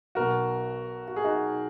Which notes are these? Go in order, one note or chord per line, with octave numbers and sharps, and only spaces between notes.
B1 B2 F#4 A#4
F#4
G#4
D#4 F#4